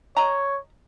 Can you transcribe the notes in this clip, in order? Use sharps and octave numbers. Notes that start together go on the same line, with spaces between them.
C#5 D#5 A#5